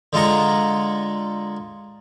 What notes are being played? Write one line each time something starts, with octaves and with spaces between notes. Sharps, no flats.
D3 G#3 F4 A#5 C#6